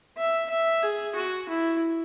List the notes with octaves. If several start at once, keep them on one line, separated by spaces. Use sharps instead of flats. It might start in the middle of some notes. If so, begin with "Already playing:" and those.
E5
E5
G#4
F#4
E4